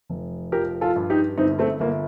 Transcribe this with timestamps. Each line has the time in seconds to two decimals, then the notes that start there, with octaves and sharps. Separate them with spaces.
0.10 F1
0.52 F3 G4 A#4
0.81 F4 A4
0.96 G2
1.10 D#4 G4
1.37 G1 C4 D#4
1.59 A3 C4
1.80 G1 A#3